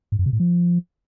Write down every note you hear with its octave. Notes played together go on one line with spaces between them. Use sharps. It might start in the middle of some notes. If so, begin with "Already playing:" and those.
G#2
F#2
C3
A2
F3